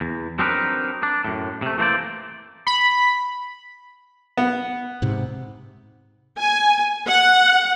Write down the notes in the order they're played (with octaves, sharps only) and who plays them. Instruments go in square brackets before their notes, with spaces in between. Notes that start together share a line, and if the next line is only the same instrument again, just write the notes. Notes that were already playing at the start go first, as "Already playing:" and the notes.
[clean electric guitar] E2
F#3 C4 D4 D#4 A#4 B4
D4
F#2 A2
C3 A3
E3 A3 A#3 C5 D5
[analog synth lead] B5
[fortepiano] B3
[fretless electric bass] G#2 C3
[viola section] G#5
F#5